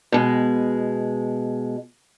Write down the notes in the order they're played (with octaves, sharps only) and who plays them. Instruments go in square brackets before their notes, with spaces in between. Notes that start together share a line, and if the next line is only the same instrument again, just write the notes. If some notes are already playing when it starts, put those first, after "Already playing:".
[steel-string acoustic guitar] B2 G#3